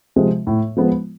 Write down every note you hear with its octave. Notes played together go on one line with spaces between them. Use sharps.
C3 F3 G#3
A2
F3 G#3 B3